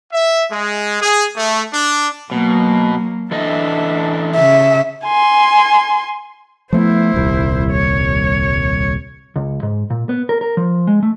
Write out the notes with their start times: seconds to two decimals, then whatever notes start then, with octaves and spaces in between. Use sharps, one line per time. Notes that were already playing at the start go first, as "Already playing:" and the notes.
0.13 E5
0.51 G#3
1.02 G#4
1.36 A3
1.73 D4
2.31 B2 F#3 A#3
3.31 E3 D4 A4 D#5 E5
4.36 C#3 E5
5.04 G#5 C6
6.73 F3 A3 B3 E4 C5
7.14 D#1 C2
7.71 C#5
9.36 C#2
9.63 G#2
9.90 A#2
10.09 B3
10.29 A#4
10.41 A#4
10.57 F3
10.87 G#3
11.03 A3